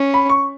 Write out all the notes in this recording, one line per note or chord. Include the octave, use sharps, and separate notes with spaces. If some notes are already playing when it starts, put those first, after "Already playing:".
Already playing: C#4
B5
C#6